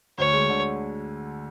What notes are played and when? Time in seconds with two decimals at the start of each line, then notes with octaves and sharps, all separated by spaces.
0.18 D2 C#5
0.34 G#3
0.49 D3